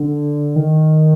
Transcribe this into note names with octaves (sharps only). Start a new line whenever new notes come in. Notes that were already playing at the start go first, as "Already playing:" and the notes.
Already playing: D3
D#3